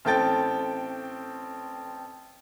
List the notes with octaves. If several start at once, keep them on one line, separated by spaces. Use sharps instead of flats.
A1 C4 A4 G5 A6